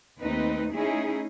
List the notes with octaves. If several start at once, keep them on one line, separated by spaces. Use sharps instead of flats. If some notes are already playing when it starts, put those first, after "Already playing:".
D#2 A3 C4 D#4 B4
A3 C#4 D#4 E4 G#4